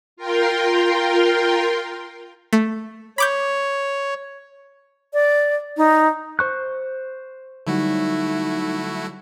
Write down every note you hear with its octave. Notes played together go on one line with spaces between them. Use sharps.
F4 A#4 G5 C6
A3
C#5 B5 D6 G6
D5
D#4
C5 C#6 F#6
D3 F#3 G3 A3 D#4 E4 F#4